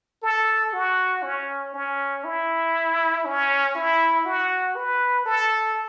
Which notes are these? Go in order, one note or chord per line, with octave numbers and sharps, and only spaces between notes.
A4
F#4
C#4
C#4
E4
C#4
E4
F#4
B4
A4